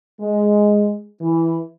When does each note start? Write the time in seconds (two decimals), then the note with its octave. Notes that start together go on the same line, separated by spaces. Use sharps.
0.20 G#3
1.21 E3